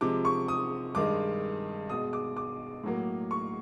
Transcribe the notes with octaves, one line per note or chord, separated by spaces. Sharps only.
C3 F3 G#3 D6
C#6
D#6
G2 D#3 G#3 D6
B2 G#3 D#6
D6
D6
A2 F#3 A#3
C#6